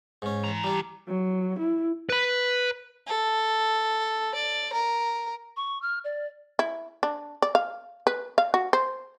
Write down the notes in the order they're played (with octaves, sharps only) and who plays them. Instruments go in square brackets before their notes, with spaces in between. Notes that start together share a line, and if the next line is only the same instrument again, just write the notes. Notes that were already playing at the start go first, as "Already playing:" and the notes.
[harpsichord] G#2 C#4
[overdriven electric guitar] E3 A#5
[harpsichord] G3 D4
[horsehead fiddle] F#3
E4
[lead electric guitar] B4 B5
[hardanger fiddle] A4
D5
A#4
[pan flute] C#6
F6
D5
[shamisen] E4
D4
D5
F5
B4
F5
F#4
C5